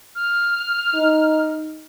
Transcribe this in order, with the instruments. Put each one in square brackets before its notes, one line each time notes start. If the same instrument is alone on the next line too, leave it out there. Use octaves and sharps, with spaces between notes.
[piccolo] F6
[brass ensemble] D#4